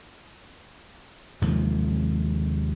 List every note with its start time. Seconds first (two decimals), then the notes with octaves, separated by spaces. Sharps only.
1.42 D#2 G#2 C3 F3